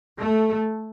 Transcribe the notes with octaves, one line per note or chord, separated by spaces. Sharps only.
A3